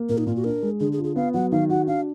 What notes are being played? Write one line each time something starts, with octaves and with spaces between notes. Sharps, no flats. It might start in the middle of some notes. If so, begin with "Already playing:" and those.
Already playing: A#3
A#2 A#4
D#4
A#2 F4
F#4
D4 A#4
G#3
D3 G#4
G#4
F4
G#4
B3 F5
F#3 F#5
D#3 F5
F#4 F#5
D4 F5